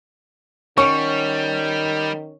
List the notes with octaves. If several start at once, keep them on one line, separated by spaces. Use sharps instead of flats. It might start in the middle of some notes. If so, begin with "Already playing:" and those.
D#3 G3 C#4 F#5 C#6